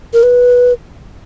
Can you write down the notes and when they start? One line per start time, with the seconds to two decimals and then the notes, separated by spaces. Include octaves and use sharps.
0.13 A#4
0.23 B4